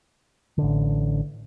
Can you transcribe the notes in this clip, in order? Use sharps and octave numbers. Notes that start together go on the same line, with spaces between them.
A1 D3